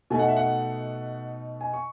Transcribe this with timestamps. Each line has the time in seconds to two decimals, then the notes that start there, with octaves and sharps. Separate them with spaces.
0.10 B2 A3 D#4 G#5
0.19 F#5
0.28 E5
0.37 F#5
1.61 G#5
1.74 C#6